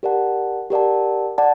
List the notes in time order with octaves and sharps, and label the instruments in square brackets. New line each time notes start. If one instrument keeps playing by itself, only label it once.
[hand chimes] G4 A#4 D5 F#5 A5
G4 A#4 D5 F#5 A5
D5 F#5 A5